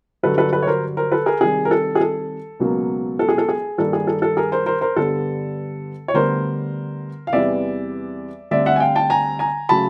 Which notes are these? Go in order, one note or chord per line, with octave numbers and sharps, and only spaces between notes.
G2 D3 F#3 A4 B4
A4 B4
A4 B4
C#5
A#4 C5
A#4 C5
A4 B4
G#4 A#4
C3 D#3 G3 G#4
A#4
A4
G#4
A4
C#2 B2 F#3 A#3
A4
G#4
A4
G#4
G2 D#3 G3 A#3 A4
G#4
A4
A4
G#4 A#4
A#4 C5
A#4 C5
A#4 C5
G2 D3 G3 B3 A4
C#5
D2 D3 G3 B3 A#4 C5
F5
E2 C3 E3 G3 B3 D5 E5
D2 D3 G3 C4 D5 E5
E5 F#5
G#5
F5 G5
G5 A5
G#5 A#5
G#5 A#5
C#3 F#3 A3 A5 B5